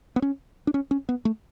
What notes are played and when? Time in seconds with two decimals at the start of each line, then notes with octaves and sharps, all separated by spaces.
0.16 B3
0.22 C#4
0.67 D4
0.74 C#4
0.91 C#4
1.09 B3
1.25 A3